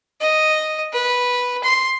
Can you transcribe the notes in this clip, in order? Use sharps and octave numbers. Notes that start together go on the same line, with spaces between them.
D#5
B4
C6